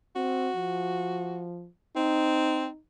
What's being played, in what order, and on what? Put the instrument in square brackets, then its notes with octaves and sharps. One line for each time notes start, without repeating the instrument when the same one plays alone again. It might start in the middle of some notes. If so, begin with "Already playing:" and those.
[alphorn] C4 [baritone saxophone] F#4
[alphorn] F3
[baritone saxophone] C4 [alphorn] D#4